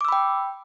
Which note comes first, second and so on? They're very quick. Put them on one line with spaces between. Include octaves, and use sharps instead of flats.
D6 E6 B5 G5